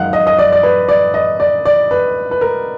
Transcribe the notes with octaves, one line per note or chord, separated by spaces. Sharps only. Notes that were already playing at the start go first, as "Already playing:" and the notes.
Already playing: F#2 D#3 G#3 F5 F#5
D#5
D#5
D5
D5
B4
D5
D#5
D5
D5
B4
B4
A#4